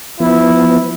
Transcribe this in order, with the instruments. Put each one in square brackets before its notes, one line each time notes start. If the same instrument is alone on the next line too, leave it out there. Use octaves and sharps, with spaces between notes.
[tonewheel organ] F3 B3 [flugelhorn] E4